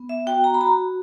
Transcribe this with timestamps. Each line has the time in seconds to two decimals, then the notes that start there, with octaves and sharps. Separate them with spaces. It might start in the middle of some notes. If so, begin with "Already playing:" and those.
Already playing: B3
0.09 E5
0.26 F#4 G5
0.44 A#5
0.54 B5
0.60 F#4 A#5